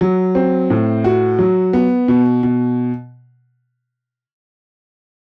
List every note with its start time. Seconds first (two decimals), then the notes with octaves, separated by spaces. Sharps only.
0.01 F#3
0.35 C4
0.70 A2
1.04 F#4
1.39 F#3
1.73 B3
2.08 B2
2.43 B2